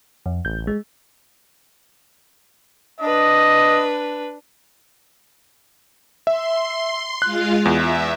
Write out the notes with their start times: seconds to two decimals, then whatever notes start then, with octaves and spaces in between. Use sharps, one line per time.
0.26 F2
0.45 A1 G6
0.67 G#3
3.01 D4 B4 D#5
6.27 E5 C6
7.22 G#3 F4 F5 F#6
7.65 E2 E5